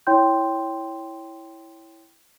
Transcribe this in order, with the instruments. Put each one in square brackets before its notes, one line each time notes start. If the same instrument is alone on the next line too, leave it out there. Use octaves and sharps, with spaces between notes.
[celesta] E4 C#5 G5 C6 G6